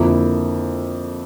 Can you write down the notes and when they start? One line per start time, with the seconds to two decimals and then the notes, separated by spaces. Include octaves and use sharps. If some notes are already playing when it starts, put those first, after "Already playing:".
Already playing: F2 D3 F3 A#3 E4